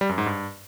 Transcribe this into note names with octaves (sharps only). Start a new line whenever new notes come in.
G3
F#2
G#2
G2